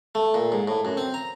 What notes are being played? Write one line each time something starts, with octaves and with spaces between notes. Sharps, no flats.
A3
A#2
G#2
A2
F#2
C4
A#5